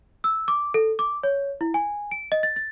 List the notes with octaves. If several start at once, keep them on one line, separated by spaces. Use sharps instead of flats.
E6
D6
A4
D6
C#5
E4
G#5
D7
D#5
A6
A6